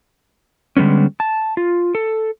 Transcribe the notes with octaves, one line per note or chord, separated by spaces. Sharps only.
D3 G3 G#3 B3 C#4
A5
F4
A4